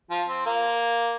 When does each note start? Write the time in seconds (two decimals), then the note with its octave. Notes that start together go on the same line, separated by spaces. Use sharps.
0.10 F3
0.29 C4
0.46 A#3